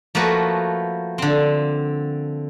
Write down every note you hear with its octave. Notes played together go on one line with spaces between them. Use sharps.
F3 A3 A#3 F#4 B4
D3 C4